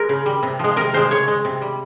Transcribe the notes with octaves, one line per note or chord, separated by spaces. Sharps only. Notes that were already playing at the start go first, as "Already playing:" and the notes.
Already playing: G#3 G#4 A#4
C#3
G3
C3
F3 G#3
C3 A#4
F3 G#3 C5
C#3 C#5
G#3
C3
G3